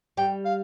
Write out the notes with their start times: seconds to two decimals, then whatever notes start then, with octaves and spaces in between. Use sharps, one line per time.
0.17 G3 G5
0.45 F5